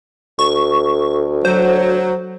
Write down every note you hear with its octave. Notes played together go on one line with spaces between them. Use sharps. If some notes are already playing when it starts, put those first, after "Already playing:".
D2 C#6
F#3 C5